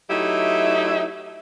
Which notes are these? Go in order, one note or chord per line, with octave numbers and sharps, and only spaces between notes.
F#3 A3 D#4 E4 G4 E5